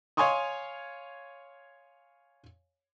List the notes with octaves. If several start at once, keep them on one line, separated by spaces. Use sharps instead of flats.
C#5 F5 G#5 C6 C#6 D#6